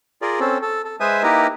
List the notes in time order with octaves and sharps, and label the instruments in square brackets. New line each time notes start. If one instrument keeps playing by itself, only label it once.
[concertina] F4 G#4 A#4 D5
C4 C#4 A4
A4
A4
G#3 B4 C5 E5 G#5 D#6
A#3 D#4 E4 G4 A#4 B4